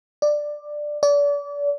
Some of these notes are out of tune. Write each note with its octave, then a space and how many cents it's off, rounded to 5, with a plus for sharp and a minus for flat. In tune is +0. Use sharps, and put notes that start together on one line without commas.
D5 +10
D5 -35